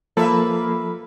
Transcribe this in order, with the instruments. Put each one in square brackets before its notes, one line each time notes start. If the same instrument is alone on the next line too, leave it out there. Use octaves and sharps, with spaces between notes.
[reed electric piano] F3 A4 [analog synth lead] A#3 [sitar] B4 E5